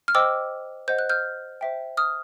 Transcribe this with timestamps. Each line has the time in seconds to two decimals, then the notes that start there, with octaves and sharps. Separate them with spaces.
0.08 F6
0.15 C5 D#5 G5 D6 E6
0.88 C5 D#5 F#5 G6
0.99 F#6
1.10 F6 G6
1.61 C5 E5 G5
1.97 D#6 F6